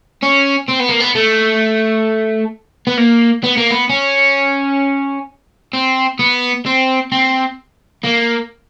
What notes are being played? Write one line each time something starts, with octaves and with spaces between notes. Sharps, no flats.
C#4
C4
B3
A#3
B3
A3
B3
A#3
B3
A#3
B3
C#4
C4
B3
C4
C4
A#3